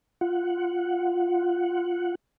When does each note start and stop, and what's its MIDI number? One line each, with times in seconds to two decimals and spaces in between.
0.21 2.15 65
0.21 2.15 78